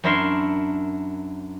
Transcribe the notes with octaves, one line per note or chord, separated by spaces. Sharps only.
F#2 D4 E4 A#4 E5 C6